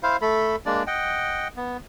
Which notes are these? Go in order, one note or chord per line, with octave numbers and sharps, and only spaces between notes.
E4 C5 F5
A3 A4 B5
G#3 A#3 D4 D5
D#5 F#5 G5
B3